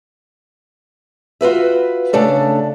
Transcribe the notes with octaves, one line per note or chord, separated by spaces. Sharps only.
F4 F#4 B4 E5
C#3 A3 D4 A4